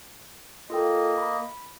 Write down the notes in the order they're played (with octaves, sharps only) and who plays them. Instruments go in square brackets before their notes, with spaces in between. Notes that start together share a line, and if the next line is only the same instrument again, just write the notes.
[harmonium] A#3 D#5 [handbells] F4 A4 G5
[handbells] B5